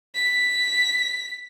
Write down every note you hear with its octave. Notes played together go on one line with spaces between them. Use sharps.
B6